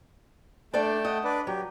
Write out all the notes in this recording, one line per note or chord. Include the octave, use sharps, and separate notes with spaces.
A3 D4 A4 D5 G5 A5
D#5 F#5
D4 B4 D5
F#3 G4